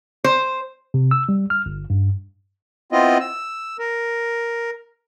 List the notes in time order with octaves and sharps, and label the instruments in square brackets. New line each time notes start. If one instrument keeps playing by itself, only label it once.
[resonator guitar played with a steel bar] C5
[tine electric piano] C3
E6
G3
F6
G1
G2
[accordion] B3 C4 E4 F4 D#5
E6
A#4